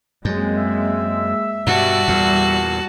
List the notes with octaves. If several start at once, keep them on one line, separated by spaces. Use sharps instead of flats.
F#2 G#3 A#3 C4
E5 E6
G2 B2 G3 F#4 A5
E2 A#2